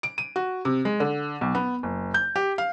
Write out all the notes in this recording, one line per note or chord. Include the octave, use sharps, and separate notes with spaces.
D7
D#7
F#4
C3
G#3
D3
B1
B3
F#1
G6
G4
F5